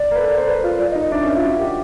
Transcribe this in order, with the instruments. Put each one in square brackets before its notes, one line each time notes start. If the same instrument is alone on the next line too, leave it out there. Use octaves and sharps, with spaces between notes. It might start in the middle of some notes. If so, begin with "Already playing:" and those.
Already playing: [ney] D5
[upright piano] A#4
B4
A4
A#4
C5
B4
F4
[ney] D5
D#5
[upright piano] D#4
[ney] D#5
[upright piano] D4 [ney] E5
[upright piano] C#4
F4
F#4
G4